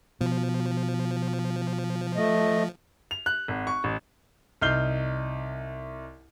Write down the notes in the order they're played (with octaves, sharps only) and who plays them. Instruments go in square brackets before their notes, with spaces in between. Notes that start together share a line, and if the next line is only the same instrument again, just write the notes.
[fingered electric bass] B2 [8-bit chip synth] F3
[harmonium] A3 D#5
[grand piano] F7
F#6
G#1
C#6
A1
C2 D#4 F6 G6 C7 G7